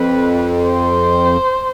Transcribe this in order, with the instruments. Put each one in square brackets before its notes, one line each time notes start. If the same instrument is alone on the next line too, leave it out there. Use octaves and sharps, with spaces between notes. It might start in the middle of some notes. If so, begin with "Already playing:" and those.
Already playing: [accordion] F2 [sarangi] B4
[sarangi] C5